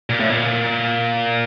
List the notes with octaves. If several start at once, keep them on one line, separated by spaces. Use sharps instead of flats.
A#2
A2
A#2